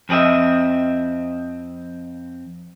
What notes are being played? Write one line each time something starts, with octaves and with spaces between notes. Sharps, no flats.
F2 C4 G#4 D#5 E5